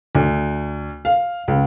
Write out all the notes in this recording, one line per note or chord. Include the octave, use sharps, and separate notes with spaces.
D2
F5
C#2